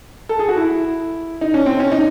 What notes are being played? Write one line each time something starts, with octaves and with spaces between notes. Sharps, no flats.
A4
G#4
F#4
E4
D#4
C#4
C4
C#4
D#4